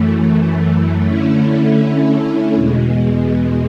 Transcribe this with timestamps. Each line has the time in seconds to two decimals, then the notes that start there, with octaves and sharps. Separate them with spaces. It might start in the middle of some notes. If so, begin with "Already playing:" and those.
Already playing: F#2 E3 A3
1.04 D3 A3 C#4 E4
2.54 E2 B2 G#3